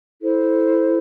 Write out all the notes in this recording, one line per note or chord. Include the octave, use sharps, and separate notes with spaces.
E4 A4 C5